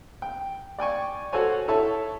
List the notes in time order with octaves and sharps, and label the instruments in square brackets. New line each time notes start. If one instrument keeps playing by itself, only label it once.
[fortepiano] G5
D5 G5 G#5 C#6
F#4 A4 C5 C#5 G#5
E4 A4 C#5 A5